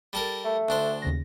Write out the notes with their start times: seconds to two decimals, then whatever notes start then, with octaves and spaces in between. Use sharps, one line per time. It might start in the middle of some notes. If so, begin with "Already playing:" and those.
0.13 G3 A4 A#4
0.44 A3
0.69 D2 D4 C5
1.02 D#2 C#3 A#6